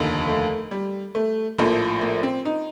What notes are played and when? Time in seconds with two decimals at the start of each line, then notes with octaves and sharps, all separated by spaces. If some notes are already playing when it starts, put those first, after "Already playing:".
Already playing: F1 D#2 D3
0.27 A3
0.71 G3
1.15 A3
1.58 A#1 A2 F3 A#3
2.01 A#3
2.23 C4
2.45 D#4